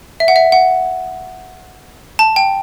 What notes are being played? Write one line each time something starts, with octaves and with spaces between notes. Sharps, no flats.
E5
F#5
E5
F#5
A5
G5